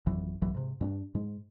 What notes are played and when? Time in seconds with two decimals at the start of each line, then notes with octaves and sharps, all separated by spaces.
0.06 G#1 F2 E3 F#3
0.42 B1 G2 E3 F#3
0.54 G#2 C3
0.81 G2 C#4 D4
1.15 G#2 G#3